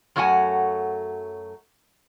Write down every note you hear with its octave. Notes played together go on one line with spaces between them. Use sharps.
F#2 F#3 A3 F#4 F#5 G#5